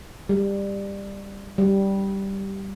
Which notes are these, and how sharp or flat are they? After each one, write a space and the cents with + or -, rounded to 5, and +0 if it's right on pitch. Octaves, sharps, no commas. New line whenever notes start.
G3 +20
G3 -5